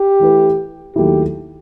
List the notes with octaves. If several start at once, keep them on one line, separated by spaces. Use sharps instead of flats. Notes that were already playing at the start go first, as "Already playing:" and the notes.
Already playing: G4
E3 A3 E4 B4
D#2 D#3 F#3 A3 E4 G4